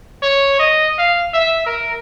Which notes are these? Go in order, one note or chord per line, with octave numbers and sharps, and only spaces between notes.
C#5
D#5
F5
E5
A#4